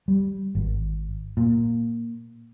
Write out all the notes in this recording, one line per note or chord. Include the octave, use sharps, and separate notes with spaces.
G3
G#1
A#2